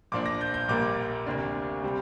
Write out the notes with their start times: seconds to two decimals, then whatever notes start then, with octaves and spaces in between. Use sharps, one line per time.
0.12 A#1 A#2 F3 D4 D6
0.26 A#6
0.41 G6
0.54 G6
0.68 A#1 A#2 G3 A#3 D6
1.26 D2 C3 A#3 D4
1.83 C3 G3 C4